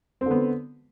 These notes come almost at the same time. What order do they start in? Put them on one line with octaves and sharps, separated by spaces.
C4 D3 B3